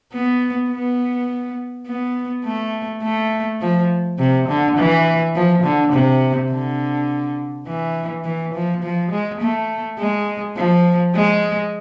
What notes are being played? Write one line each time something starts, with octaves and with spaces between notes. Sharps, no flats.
B3
B3
B3
A3
A3
F3
C3
D3
E3
F3
D3
C3
D3
E3
E3
F3
F3
G#3
A3
G#3
F3
G#3